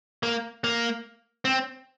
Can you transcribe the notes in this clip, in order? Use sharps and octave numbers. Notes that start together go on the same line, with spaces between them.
A#3
A#3
C4